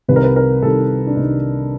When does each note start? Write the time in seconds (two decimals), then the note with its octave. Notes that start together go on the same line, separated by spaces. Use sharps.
0.08 C2 C3 D#3 G3 B4
0.16 A#4
0.24 B4
0.36 A#4
0.63 C2 C3 D#3 G3 A4
1.07 D4
1.16 C2 C3 D#3 G3 D#4